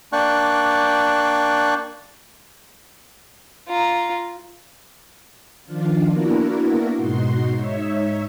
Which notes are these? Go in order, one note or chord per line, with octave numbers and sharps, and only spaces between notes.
A#3 D4 D5 G5 C#6 F#6
F4 A#5
D#3 F3 D4 F4
A#3 B3 D4 E4 F#4 A#4
G#2 B2 D#4 F#4 C6
G#2 D#4 C#5 E5